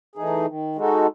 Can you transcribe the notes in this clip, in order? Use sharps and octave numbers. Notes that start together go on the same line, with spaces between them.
E3 A3 D#4 G#4
D#3
G#3 D#4 F#4 A4